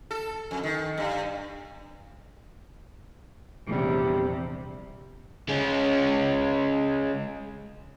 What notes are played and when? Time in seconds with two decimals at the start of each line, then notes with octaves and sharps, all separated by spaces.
0.11 A4
0.51 F2
0.63 D#3
0.97 G2
3.68 A#1 E2 C3 G3
5.49 G#3 C#4